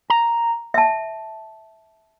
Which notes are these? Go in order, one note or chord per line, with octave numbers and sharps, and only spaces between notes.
A#5
E5 A5